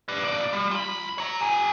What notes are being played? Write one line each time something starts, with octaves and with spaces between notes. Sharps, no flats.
B4 D5
B1 D5
G3
F4 B5
C#5 A#5
G4 G#5